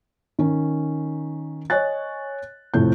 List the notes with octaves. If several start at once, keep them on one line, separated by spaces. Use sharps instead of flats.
D#3 C#4
C#5 D#5 G#5 F#6 A6
F2 A2 C3 A3 G6